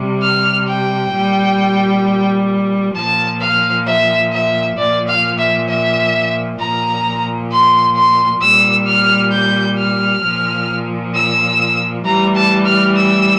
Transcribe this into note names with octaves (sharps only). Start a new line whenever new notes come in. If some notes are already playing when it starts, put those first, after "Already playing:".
Already playing: C3 G3
F6
G5
A#2 G3
A#2 F3 A5
F5
E5
E5
A#2 F3 D5
F5
E5
E5
A#2 F3 A#5
C6
C6
A#2 G3 E6
F6
G6
F6
A#2 F3
E6
A2 E3 G3 A#5
A5
F6
E6